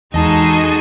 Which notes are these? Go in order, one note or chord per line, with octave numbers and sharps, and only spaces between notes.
E2 G#3 D#4 F#4 G#4 A4 D#5 A5